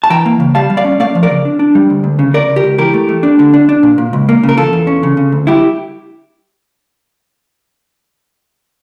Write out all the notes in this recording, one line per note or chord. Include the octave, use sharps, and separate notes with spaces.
A5
E3 G5 A#5
A#3
C#3
G3 F5 A5
G3
D5 F5
C#4
A3 D5 F5
F3
A#4 D5
C#3
D4
D4
G3
D2
D2
C#3
C#3 A#4 D5
C#3
G4 A#4
C#2
E3 G4 A#4
A3
A3
D4
D3
D4
D4
A#2
A#2
C#2
A#3
C#3
A#4
E2 F4 A4
E2
C#4
C#3
C#3
D2
G3 E4 G4